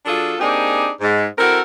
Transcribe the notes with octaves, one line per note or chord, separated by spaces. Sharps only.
F#3 D4 F4 G#4 A4
A#3 C4 D4 D#4 G4 G#4
G#2
C4 E4 F#4 A4 A#4